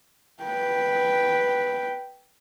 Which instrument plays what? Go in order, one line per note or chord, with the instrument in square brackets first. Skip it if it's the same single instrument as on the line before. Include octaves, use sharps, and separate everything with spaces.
[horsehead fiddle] B4 G5